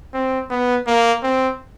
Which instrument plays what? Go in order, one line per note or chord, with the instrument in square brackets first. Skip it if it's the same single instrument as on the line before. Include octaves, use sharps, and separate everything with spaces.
[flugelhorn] C4
B3
A#3
C4